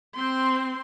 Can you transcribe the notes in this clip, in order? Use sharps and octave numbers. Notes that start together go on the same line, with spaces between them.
C4 C6